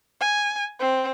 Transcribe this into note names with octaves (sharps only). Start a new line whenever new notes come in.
G#5
C4